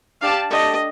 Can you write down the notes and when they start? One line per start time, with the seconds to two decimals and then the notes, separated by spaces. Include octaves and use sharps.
0.21 D4 G4 D5 F5 A5
0.50 A3 D4 G4 D#5